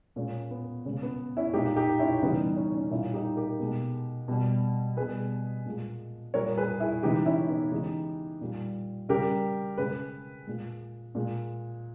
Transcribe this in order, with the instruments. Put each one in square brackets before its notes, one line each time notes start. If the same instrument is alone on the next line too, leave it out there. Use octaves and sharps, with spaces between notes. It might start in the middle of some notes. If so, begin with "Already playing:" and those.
[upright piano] A#2 G#3 C#4
B3
C#3 C#4
G#3
B3
C#4 E4
A#2 G#3 D#4 G4
D#4 G4
C#4 E4
C#3 E3 G3 B3 D#4
D#4
C#4
C#4
A#2 G3 C#4 E4
D#4 G4
G4 A#4
B2 G#3
B2 G3
B2 G3 G#4 B4
A#2 G#3
A#2 G3 A#4 C#5
G#4 B4
E4 G#4
C#3 E3 G#3 D#4 G4
C#4 E4
B3 D#4
C#3 E3 G#3 D#4 G4
A#2 G3
C#3 G3 G4 A#4
C#3 G#3 G#4 B4
A#2 G#3
A#2 G#3